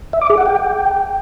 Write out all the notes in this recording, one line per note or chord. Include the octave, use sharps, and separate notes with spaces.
E5
D6
G#4
F#5
G5